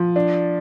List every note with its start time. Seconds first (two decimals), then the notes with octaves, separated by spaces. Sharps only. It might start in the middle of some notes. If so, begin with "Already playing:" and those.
Already playing: F3
0.16 D4